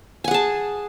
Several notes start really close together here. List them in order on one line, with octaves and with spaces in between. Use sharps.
G#5 F#5 G#4 A5